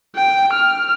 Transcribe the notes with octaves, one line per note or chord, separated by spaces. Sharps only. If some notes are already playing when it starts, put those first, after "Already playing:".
G5
F6